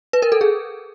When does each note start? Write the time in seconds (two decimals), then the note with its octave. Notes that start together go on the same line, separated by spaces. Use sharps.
0.13 B4
0.22 A#4
0.32 A4
0.41 G#4